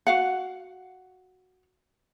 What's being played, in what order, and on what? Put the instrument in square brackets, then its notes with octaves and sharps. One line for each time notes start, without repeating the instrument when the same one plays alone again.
[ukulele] F#4 F5 F#5